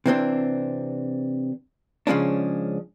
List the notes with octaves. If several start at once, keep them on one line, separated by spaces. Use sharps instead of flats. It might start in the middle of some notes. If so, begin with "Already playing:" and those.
C3 E3 C4 D4
C#3 F3 G#3 C#4 D4